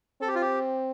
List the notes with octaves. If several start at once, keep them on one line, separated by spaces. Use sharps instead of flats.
C4 A4
G4
F4
G4